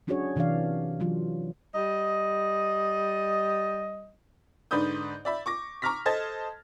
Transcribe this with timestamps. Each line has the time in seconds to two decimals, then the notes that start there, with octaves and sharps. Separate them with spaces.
0.07 F#3 C#4 D4 F#4 G#4 C#5
0.36 C3 E3 D4 D5 F5
1.00 E3 F#3 F4
1.74 G3 D#5
4.71 G#2 D3 B4 D5 D#6 G6
5.25 D5 E5 B5
5.46 C#6 D6 A#6
5.82 A#5 C#6 D6 F6 A#6 B6
6.06 A4 C5 D#5 A5 G#6 A6